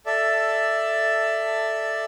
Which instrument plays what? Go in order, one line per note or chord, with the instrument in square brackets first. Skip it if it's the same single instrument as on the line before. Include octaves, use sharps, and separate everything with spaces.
[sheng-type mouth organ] A4 D5 E5